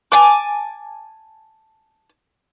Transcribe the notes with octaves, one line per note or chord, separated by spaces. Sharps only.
G#5 A5 D6